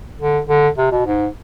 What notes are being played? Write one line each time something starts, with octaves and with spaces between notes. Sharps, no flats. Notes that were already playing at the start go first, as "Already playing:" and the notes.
D3
D3
C3
B2
G#2